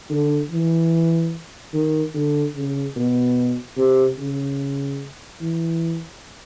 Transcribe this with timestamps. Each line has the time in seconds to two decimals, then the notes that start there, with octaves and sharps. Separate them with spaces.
0.10 D3
0.50 E3
1.73 D#3
2.14 D3
2.55 C#3
2.96 B2
3.77 C3
4.19 C#3
5.41 E3